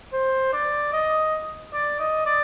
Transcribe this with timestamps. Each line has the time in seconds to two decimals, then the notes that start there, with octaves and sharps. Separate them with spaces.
0.13 C5
0.53 D5
0.93 D#5
1.73 D5
2.00 D#5
2.26 D5